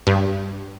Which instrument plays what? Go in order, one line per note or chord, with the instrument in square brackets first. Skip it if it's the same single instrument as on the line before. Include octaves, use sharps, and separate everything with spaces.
[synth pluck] G2